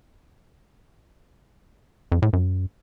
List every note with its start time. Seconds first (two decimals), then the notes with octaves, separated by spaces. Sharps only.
2.12 F2
2.22 A2
2.33 F#2